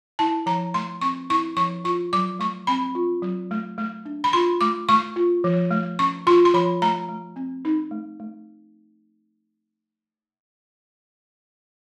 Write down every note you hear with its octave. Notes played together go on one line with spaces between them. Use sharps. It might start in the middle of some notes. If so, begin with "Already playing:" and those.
E4 A5
F3 A#5
A3 C6
C4 C#6
E4 C#6
F3 C#6
F4 C#6
F#3 D6
A3 C#6
C4 B5
F4
F#3
A3
A3
D4
B5
F4 C6
A3 D6
A3 C#6
F4
F3
A3
C#4 C#6
F4 C6
C6
F3 B5
A3 A#5
A3
C4
D#4
A3
A3